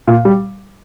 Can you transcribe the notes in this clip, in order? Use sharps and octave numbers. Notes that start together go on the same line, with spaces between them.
A#2
G3